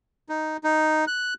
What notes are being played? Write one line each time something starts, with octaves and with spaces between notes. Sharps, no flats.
D#4
D#4
F#6